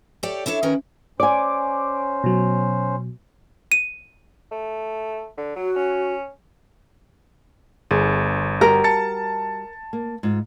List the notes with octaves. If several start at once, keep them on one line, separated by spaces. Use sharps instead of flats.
G4 A4 C#5 D5 G5
D4 E4 A4 C#5
D#3 C#4 A#4 B4
C#4 C5 D5 G#5 D6
B2 F#3
D#7
A3
D3
F#3 F#4
C#4
G1 G#4
G3 F#4 G4 A#4
A5 A6 C#7
A#3
G#2 F4